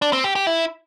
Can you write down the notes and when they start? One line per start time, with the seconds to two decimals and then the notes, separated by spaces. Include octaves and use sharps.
0.02 D4
0.13 C4
0.24 G4
0.36 G4
0.47 E4